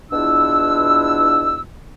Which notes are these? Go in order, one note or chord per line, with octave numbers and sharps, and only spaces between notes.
E2 B2 D4 E4 F4 E6